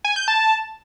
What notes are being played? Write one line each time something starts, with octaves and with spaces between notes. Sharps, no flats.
G#5
G6
A5